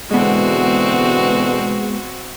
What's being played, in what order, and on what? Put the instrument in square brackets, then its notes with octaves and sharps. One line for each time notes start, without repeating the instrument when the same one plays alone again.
[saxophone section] B2 D3 E3 [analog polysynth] G#3 B3 [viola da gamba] C4 F#4